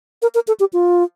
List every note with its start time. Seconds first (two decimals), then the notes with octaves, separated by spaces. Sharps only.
0.22 A#4
0.35 A#4
0.48 A4
0.60 G4
0.73 F4